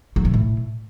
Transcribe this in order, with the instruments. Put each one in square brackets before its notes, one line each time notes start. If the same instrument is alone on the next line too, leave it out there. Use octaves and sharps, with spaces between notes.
[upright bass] F#3
C3
A2